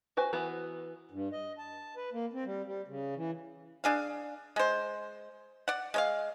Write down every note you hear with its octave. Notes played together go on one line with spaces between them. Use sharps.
F#4 B4 C5 G#5
E3 B3 F#4 B5
G2
D#5
A5
B4
A#3
C4
G3
G3
C#3
E3
D4 G#4 F5
G#3 C5
D5 F#5
G#3 C#5 F5